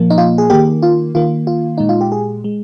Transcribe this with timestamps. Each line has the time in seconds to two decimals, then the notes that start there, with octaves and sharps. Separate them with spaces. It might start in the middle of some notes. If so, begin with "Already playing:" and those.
Already playing: A#2 F3 A#3
0.10 D#4
0.18 F4
0.38 G#4
0.50 D#3 A#3 G4
0.82 F4
1.15 D#3 A#3 F4
1.47 F4
1.78 A#2 G#3 D#4
1.89 F4
2.01 G4
2.12 G#4
2.44 G#3